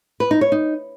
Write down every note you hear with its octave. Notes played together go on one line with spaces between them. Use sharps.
B4
D#4
C#5
D#4